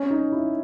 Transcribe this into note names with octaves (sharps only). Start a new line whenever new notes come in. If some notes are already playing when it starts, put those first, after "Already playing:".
Already playing: C#4
D#4
E4